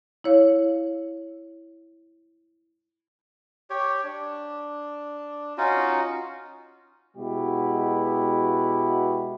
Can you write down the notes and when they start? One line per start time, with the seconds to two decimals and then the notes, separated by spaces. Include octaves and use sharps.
0.24 E4 C#5 F5
3.70 G4 C#5
4.03 D4
5.58 C#4 D#4 F4 F#4
7.17 B2 G#3 E4 F#4 G4